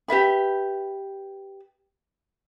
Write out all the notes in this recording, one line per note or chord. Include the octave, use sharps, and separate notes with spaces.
G4 B4 E5 B5